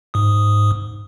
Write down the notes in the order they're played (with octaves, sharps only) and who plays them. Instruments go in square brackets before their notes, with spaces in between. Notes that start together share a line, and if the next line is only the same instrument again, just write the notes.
[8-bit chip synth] G#2 D#6